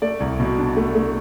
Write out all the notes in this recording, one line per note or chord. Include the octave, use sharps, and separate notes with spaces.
A3 D5
C2
B2
D4
A3
A3